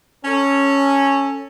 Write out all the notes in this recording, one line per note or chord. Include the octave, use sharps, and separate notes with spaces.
C#4 A4